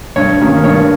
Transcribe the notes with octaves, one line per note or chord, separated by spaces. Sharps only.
G2 C#5
D#3 A#3 C#4
G2 C#5